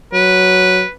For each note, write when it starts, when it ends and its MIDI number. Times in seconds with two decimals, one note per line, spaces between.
0.13 0.83 54
0.13 0.92 71